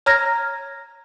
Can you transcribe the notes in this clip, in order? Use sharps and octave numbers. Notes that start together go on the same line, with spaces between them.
C#5 A#5 F6 G#6 A#6